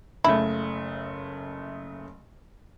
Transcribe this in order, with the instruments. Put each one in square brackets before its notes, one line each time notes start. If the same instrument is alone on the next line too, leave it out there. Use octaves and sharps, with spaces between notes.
[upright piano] F#1 C#3 A3 [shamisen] E4